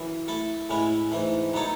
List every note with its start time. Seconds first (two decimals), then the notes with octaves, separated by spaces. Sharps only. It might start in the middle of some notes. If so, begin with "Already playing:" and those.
Already playing: F#2 E3
0.28 A3 E4 A4 E5
0.69 A2 G#3 C#4 E4 B4
1.12 G#2 E3 A3
1.53 F#3 B3 D#4 A4 C#5